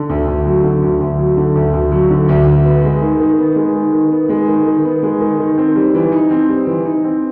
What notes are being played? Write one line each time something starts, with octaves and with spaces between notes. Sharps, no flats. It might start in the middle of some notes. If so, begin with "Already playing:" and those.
Already playing: D3
D2
D2
F#3
D3
D2
D2
F#3
D3
D2
D2
F#3
D3
D2
D2
B3
G#3
D#3
D#3
B3
G#3
D#3
D#3
B3
G#3
D#3
D#3
B3
G#3
D#3
D#3
C4
G3
E3
D#4
C4
G3
E3
D#4
C4